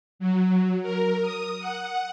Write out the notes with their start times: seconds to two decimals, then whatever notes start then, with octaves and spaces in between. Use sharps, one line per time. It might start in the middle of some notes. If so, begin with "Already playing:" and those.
0.19 F#3
0.83 A#4
1.22 D#6
1.60 F#5